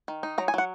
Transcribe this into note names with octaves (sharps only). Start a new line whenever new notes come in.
D#3
D#4
F#3 A#5
G#5
F#3 F#5